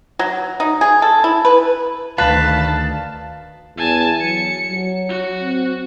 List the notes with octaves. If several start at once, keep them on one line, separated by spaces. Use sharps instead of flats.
F#3
D#4
G#4
A4
E4
B4
D2 D#3 B4 F5 A5
E2 G#5 A5
F#3 C#7
F#3
F#4
C4